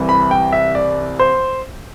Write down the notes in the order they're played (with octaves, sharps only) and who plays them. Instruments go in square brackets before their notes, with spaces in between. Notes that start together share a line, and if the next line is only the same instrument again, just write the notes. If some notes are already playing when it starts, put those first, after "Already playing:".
Already playing: [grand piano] C2 C3 E3
B5
G5
E5
D5
C5